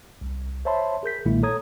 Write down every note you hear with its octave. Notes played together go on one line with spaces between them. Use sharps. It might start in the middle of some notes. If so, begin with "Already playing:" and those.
C2
C5 C#5 E5 A5 B5 C6
G#4 A#4 G6 B6
B1 A#2 D#3 G#3 A#3 E4
A4 C#5 A#5 D#6 G#6